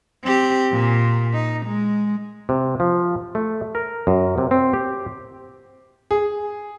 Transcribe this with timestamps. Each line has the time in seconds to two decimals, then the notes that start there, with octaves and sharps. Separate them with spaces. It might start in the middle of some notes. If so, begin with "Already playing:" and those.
0.24 C4 G4
0.72 A#2
1.34 D#4
1.66 G#3
2.49 C3
2.80 F3
3.35 A3
3.75 A#4
4.07 F#2
4.38 C3
4.51 C4
4.73 G4
6.11 G#4